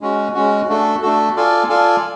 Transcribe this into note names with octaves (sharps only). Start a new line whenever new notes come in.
G#3 C#4 F#4
G#3 C#4 F#4
A3 D4 F#4 A4
A3 D4 F#4 A4
F4 A4 D5 F5 G#5
F4 A4 D5 F5 G#5